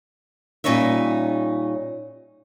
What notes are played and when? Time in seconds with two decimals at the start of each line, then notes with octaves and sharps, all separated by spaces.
0.64 A#2 G3 C#4 D#4 C#5 E5